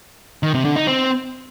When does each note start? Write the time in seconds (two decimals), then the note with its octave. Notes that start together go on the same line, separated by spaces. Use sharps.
0.43 D#3
0.54 C3
0.65 D3
0.76 D#4
0.87 C4